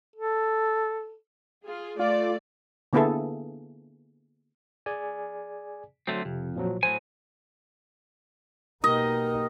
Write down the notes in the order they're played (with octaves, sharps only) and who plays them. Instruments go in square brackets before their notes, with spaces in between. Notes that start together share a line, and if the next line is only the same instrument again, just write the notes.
[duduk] A4
[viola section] F4 G#4
[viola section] A3 D5 [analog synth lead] F4
[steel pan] D3 A#3 B3 E4 G#4 A4
[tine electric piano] G#4 D5 G#5
[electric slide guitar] D3 A3 C4 [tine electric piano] F#3 C6
[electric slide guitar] F2 [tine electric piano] C3
[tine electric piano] A#2 F3 F#3
[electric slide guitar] A2 F#3 G#5 [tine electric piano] C5
[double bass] B2 D#4 [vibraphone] A#3 G4 G5 [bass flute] A#4 [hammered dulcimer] D#5